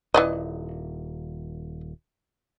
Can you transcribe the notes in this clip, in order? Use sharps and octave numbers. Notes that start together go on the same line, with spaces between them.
D#1 E3 D5 D#5